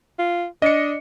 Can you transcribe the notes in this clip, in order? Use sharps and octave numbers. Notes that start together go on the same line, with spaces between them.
F4
D4 D#5 C#7